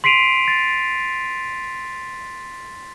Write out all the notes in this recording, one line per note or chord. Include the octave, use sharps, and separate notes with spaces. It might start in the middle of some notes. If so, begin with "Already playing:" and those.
C6 B6 C7 D7 D#7 F7
A6